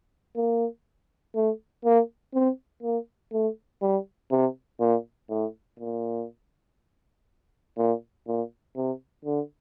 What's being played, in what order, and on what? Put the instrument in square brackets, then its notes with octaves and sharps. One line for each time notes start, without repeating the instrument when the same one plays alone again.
[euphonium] A#3
A3
A#3
C4
A#3
A3
G3
C3
A#2
A2
A#2
A#2
A#2
C3
D3